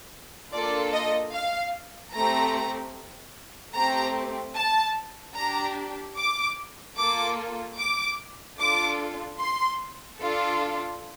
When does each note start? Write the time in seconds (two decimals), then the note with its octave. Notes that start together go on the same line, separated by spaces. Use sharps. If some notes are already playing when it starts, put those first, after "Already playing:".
0.53 A#3 D4 F4 A4 D5
0.93 D#5
1.33 F5
2.14 A3 C4 G4 A#5
3.75 A3 C4 G4 A#5
4.56 A5
5.36 D4 G4 A#5
6.18 D6
6.98 A#3 F4 A4 D6
7.79 D6
8.59 D4 F4 A4 D6
9.40 C6
10.20 D4 F4 A4